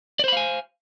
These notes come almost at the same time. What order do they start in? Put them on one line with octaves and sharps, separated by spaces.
D5 C5 B5 F5 G#5